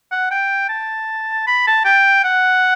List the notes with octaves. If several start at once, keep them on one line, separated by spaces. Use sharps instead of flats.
F#5
G5
A5
B5
A5
G5
F#5